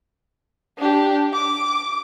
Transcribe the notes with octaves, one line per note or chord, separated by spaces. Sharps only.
D4 G4
D6